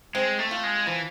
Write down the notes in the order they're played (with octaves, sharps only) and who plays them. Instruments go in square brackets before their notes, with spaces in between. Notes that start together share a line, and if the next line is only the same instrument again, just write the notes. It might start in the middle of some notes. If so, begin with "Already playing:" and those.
[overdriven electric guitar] G#3 [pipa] C4
[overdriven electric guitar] A3
[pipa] F4
[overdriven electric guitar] G#3
[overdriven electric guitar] E3 [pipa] F3